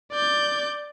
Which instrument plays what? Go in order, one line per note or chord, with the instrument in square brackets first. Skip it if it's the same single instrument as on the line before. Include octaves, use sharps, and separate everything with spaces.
[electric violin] D5 G6